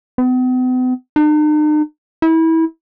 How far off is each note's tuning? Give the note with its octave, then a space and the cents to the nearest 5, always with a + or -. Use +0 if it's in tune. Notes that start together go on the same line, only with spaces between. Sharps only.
B3 +45
D#4 -45
E4 -25